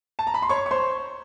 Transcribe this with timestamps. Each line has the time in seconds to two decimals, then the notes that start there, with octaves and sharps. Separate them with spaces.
0.19 A5
0.27 A#5
0.34 B5
0.42 C6
0.49 C#5 C#6
0.66 C#6
0.71 C5 C6